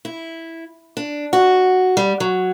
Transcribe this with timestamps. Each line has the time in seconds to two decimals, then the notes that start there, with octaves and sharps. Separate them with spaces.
0.05 E4
0.97 D4
1.33 F#4
1.97 G3
2.20 F#3